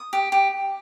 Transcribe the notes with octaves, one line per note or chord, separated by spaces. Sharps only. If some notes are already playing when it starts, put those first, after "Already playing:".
Already playing: D#6
G4
G4